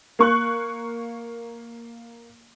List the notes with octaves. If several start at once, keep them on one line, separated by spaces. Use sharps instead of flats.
A#3 C#6 F#6